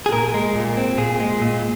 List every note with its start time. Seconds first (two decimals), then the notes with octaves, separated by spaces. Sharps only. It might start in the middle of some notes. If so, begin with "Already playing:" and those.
0.06 G#4
0.13 A#2 A#4
0.34 G#3
0.56 A#2
0.77 C4
0.98 A#2 G#4
1.20 G#3
1.42 A#2